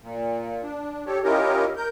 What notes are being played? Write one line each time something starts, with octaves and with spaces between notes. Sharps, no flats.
A#2
D4
G4 A4 C#5
C#4 E4 F4 G4 A#4 D#5
A#4 G6